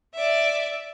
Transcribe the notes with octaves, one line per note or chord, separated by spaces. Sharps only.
D5 E5